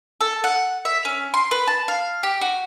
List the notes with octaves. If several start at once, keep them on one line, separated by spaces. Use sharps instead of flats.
A4
F#5
E5
C#4
C6
B4
A5
F5
G4
F#4